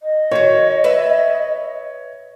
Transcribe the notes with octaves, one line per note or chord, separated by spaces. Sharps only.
D#5
D#3 F#4 C#5
B4 E5